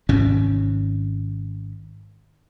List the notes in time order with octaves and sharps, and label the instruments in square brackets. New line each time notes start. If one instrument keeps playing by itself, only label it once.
[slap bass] G#1 G#2 C3 C#4